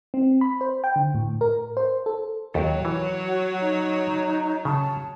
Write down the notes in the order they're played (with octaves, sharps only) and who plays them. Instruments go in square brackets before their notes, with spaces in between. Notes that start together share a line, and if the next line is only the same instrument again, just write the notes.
[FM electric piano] C4
B5
C5
G5
D3
A2
A#4
C5
A4
[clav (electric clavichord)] D#2 A4 [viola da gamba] F#3 C#5
[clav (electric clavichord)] E3
[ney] F#4
D#4
[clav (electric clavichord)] C#3 [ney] A5